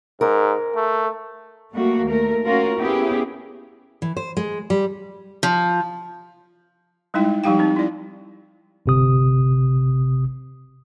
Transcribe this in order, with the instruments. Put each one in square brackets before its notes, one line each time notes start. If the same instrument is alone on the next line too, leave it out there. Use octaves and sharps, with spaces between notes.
[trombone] G#2 [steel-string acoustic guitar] A#4
[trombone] A3
[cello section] G3 A3 A#3 F#4
D#2 A3 A#4
C#4 F4 F#4 A#4
B3 C#4 E4 G4 G#4
[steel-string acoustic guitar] E3
C5
G#3
G3
F3
[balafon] G3 G#3 D#4 E4 G5
F3 G3 D#4 G4 F5 G5
C4 D#4
E4 D5
[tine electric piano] G1 C3 D#6